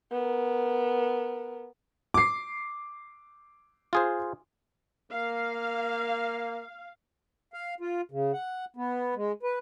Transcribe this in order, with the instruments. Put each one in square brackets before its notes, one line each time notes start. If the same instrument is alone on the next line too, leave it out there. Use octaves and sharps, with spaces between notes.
[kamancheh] B3 A#4
[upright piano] D6 C7
[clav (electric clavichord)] F4 G#4 C5
[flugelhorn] A#3 [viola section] F5
[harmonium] F5
F4
C#3
F#5
B3
G#3
B4